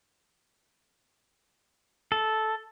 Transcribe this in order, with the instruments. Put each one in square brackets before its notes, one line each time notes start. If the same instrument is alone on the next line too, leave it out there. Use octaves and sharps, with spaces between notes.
[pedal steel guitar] A4